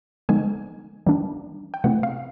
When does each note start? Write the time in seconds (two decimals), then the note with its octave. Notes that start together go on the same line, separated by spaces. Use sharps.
0.29 D3 F3 G#3 B3 D#4 G#5
1.06 E3 G3 A#3 D4
1.74 G5
1.84 C3 E3 A3 C4 E4 F#5
2.03 F5